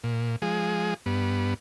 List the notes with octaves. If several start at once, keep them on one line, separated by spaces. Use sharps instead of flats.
A#2
F3 G#3 G#4
G2 B3